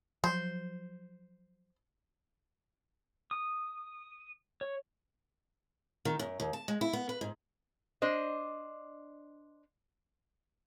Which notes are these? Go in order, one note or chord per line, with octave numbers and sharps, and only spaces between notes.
F3 F#3 C5
D#6
C#5
D#3
F#2
D#2
A5
G#3
E4
B3
B4
G#2
D4 C5 D#5